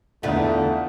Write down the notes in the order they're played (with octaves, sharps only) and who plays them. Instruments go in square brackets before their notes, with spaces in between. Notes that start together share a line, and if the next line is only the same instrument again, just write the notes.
[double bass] E2 [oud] D3 F4 B4 [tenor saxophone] A3 [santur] D#4 F5 F#5